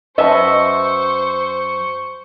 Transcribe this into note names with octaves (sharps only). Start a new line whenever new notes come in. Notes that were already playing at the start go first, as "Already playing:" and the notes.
F#2 B4 C5 D#5 E5 A5 C#6